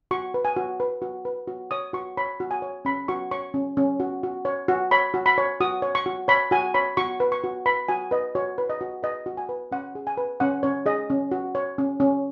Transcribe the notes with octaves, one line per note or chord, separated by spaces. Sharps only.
F#4 C#6
B4
G#5
F#4
B4
F#4
B4
F#4
C#5 D#6
F#4 C#6
C#5 B5
F#4
G#5
C#5
C#4 B5
F#4 C#6
C#5 C#6
C#4
C#4
F#4
F#4
C#5
F#4
C#5 B5
F#4
B5
C#5
F#4 D#6
C#5
C#6
F#4
C#5 B5
F#4 G#5
C#5 B5
F#4 C#6
B4
C#6
F#4
B4 B5
F#4 G#5
B4 D#5
F#4 C#5
B4
D#5
F#4
B4 D#5
F#4
G#5
B4
C#4 F#5
G#4
G#5
B4
C#4 F#5
C#4 C#5
G#4 D#5
C#4
F#4
C#5
C#4
C#4